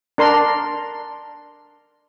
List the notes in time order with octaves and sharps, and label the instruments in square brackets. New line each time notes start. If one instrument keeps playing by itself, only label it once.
[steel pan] D4 A#4 C6